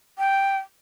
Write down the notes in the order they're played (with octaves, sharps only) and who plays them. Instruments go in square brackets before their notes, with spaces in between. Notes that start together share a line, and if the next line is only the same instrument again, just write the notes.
[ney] G5